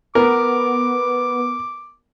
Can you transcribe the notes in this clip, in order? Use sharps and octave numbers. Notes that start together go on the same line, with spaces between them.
B3 A#4 D6